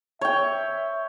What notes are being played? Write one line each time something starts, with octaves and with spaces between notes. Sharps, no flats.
C#5 E5 G5